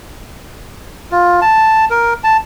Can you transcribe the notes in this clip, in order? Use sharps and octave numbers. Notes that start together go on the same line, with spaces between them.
F4
A5
A#4
A5